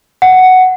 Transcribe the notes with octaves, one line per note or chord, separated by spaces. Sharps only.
F#5